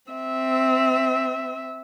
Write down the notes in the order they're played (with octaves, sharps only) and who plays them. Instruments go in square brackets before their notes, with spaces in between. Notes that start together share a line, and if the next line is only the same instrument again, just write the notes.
[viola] C4 E5